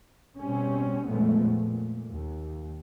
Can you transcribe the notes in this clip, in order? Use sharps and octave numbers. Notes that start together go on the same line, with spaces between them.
B2 G3 C4 C#4
F2 A#2 F3 G#3 A3 B3
A#2
D#2